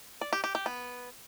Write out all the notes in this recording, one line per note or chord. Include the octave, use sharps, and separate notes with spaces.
D5
G4
G4
G4
B3